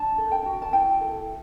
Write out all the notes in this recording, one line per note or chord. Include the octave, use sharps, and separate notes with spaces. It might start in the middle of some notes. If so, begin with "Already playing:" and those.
Already playing: D4 A5
A4
G5
F#4
A5
E4 G5
A4